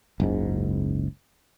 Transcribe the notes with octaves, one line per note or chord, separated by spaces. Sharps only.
F#1 C#2 G#2